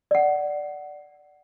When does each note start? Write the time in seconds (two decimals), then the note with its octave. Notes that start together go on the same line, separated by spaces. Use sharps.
0.11 D5 F#5